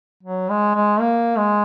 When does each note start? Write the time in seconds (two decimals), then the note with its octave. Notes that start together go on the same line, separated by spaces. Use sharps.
0.23 F#3
0.49 G#3
0.75 G#3
1.00 A#3
1.38 G#3